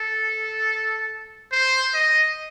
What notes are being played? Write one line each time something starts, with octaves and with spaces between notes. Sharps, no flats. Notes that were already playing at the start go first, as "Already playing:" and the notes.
Already playing: A4
C5
D#5